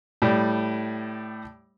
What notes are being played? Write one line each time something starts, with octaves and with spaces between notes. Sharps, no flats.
A2 G3